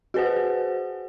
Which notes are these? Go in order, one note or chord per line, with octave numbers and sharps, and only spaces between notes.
F#4 G#4 B4 C5 F#5